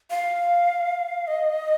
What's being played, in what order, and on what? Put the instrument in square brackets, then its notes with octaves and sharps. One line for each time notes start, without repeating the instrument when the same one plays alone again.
[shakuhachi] F5
D#5